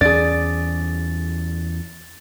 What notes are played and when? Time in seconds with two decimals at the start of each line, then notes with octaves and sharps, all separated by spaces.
0.01 E2 C#4 G#4 D5 A6